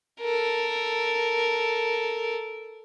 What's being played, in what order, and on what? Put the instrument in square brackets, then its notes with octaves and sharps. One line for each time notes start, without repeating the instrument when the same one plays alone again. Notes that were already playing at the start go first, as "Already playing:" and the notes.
[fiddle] A4 A#4